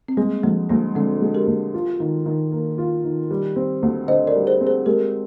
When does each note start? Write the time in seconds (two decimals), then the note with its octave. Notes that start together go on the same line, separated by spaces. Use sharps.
0.08 C4
0.17 G3 G#3 A#3
0.43 D2 F3 G#3
0.70 D2 G3 A#3
0.96 D3 G#3 C4
1.22 G#3
1.34 G4 A#4
1.47 D2
1.74 F4
2.00 D#3
2.26 D#3
2.52 A#3
2.78 F4
3.05 D#3
3.31 G3
3.56 C4
3.83 D2
4.08 D3 C5 D#5
4.27 A#4 D5
4.35 G3
4.47 G#4 C5
4.61 C4
4.67 G#4 C5
4.86 G#3 G4 A#4